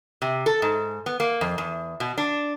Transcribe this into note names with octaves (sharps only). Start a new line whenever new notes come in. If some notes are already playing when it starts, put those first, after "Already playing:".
C3
A4
G#2
B3
A#3
F2
E2
B2
D4